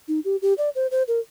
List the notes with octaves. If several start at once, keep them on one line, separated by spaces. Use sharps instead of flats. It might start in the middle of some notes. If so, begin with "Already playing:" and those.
D#4
G4
G4
D5
C5
C5
A#4